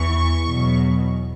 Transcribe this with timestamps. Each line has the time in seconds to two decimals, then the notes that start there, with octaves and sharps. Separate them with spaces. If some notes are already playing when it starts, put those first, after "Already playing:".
Already playing: E2 E3 C#6
0.45 E2 B2 F#3